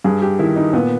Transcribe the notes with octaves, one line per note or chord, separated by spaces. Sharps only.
G2 G#4
G4
D#3 E4
D#4
A#2 B3